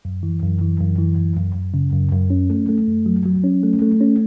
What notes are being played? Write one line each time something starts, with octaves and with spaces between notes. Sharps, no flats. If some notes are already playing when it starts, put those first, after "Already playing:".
F#2
E3
F#2
E3
F#2
E3
F#2
F#2
F#2
C#3
F#2
F#2
C#4
A3
A3
F#2
F#3
F#3
C#4
A3
A3
C#4